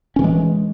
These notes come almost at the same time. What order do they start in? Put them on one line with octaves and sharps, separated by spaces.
C#4 D#3 E3 G#3